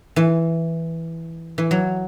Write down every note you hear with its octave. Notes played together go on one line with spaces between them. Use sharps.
E3
E3
F#3